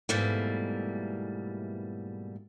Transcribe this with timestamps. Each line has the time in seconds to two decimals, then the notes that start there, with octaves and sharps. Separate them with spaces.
0.09 G#2 B2 E3 G3 A3 A#3